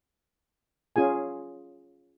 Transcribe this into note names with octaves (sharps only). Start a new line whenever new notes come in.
C#4 F4 G#4 G#5